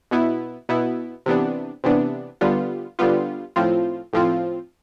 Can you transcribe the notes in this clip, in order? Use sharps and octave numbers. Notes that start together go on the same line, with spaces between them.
B2 B3 E4
B2 B3 E4
C3 E3 B3 D4
C3 E3 B3 D4
D3 G3 B3 F4
D3 G3 B3 F4
A2 F3 C4 F4
A2 F3 C4 F4